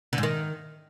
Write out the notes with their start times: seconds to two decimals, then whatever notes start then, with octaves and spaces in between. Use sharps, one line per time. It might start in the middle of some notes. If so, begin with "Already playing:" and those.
0.13 D3
0.18 G#2
0.23 D#3